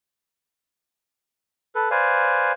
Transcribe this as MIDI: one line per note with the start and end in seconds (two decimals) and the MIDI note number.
1.75 1.89 69
1.75 1.89 71
1.91 2.52 71
1.91 2.52 72
1.91 2.52 74
1.91 2.52 77
1.91 2.52 80